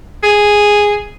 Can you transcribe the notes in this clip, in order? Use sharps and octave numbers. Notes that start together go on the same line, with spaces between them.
G#4